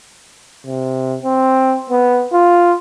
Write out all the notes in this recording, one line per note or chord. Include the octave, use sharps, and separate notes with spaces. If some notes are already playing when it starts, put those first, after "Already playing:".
C3
C4
B3
F4